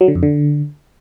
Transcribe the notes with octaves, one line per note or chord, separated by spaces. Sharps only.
F#3
D3
F2
D3